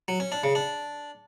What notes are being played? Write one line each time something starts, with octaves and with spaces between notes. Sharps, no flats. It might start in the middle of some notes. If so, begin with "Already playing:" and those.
F#3
C#4
D4
C#3
D4